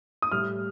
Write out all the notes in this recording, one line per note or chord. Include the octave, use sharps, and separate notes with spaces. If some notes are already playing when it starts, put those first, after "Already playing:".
D#6
A2 G3 F6